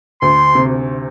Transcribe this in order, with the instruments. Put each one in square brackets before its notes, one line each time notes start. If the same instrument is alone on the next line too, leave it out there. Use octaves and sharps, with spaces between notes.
[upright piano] D2 [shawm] C6
[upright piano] C3